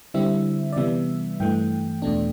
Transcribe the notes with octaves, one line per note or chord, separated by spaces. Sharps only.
D3 G3 C4 E4 E5
D5
C3 E3 G3 B3 E5
G2 E3 A3 G5
E2 B2 A3 D4